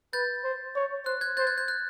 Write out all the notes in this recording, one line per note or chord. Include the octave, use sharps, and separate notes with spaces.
B4 G6 A6
C5
C#5
C5 F#6
F#6 G#6
C5 G6 A6
F#6 G#6
G6
F#6